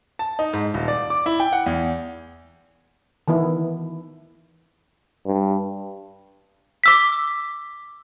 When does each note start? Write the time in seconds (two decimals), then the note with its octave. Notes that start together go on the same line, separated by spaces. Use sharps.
0.19 A5
0.39 D#4
0.53 G#2
0.74 D#1
0.88 D5
1.10 D6
1.26 E4
1.40 G5
1.53 F#5
1.66 E2
3.28 D#3 E3 B3 E4
5.26 G2
6.84 D6 E6 B6